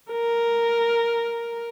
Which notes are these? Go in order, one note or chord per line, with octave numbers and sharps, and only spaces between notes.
A#4